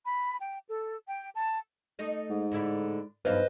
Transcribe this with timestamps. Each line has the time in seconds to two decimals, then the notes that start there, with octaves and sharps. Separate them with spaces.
0.05 B5
0.40 G5
0.68 A4
1.07 G5
1.34 A5
1.99 A3 D#4 D#5
2.30 G#2
2.51 A2 D3 E4
3.25 B1 G2 E3 F4 B4 C5 D#5